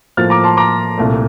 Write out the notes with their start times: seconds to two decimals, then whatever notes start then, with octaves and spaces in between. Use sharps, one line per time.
0.17 A2 F3 A#3 F4 F6 A6
0.30 A#5 D6
0.44 A5 C6
0.57 A#5 D6
0.98 C2 A#2 A3